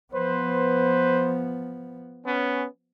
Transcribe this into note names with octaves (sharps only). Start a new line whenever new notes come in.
F3 B3 B4 C5
B3 C#4